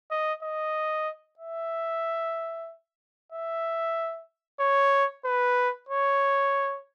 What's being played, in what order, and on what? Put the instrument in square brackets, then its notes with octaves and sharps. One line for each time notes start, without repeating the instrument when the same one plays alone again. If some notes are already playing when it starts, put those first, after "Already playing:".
[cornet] D#5
D#5
E5
E5
C#5
B4
C#5